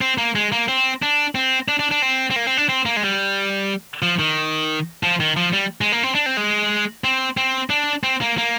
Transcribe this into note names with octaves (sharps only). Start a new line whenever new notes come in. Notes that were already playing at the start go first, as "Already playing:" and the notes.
C4
A#3
G#3
A#3
C4
D4
C4
D4
D4
D4
C4
C4
A#3
C4
D4
C4
A#3
G#3
G3
F3
D#3
F3
D#3
F3
G3
G#3
A#3
C4
D4
C4
G#3
C4
C4
D4
C4
A#3
A#3